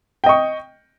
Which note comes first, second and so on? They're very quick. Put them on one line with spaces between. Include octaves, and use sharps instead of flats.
G5 D#5 C#6